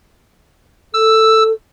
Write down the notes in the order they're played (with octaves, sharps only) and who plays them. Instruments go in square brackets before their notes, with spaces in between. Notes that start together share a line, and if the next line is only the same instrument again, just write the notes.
[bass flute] A4 [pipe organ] E6